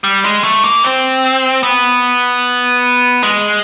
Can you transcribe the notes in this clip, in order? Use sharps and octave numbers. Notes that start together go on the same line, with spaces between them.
G3
G#3
A3
A#3
C4
B3
G#3